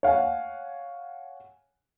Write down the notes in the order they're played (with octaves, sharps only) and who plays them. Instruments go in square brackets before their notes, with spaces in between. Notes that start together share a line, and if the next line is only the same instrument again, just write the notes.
[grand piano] C#5 F5 F#5 G#5